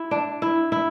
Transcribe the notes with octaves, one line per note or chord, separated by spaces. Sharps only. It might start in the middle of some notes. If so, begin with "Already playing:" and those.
Already playing: E4
D4
E4
E4